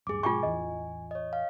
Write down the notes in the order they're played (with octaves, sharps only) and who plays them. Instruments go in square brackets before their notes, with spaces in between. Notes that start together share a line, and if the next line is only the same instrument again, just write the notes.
[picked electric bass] D1 A1 G2 [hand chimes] G#4 D6
[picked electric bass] G#2 B2 G#3 [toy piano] F4 G5 C#6 [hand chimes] G#5
[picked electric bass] A1 E2 E3 [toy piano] D#5
[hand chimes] C#5 D#5
F5